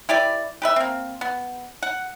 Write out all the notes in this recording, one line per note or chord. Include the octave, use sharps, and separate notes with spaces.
E4 G4 B4 D5
G4 B4 E5
A#3 C4
B3
F#5